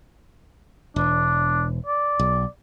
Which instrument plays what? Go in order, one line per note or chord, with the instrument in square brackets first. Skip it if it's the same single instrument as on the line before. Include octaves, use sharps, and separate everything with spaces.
[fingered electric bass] E1 [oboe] D4
[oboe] D5
[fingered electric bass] B1